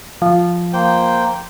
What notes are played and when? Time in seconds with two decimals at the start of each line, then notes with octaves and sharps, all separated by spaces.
0.22 F3
0.73 A#3 C5 G5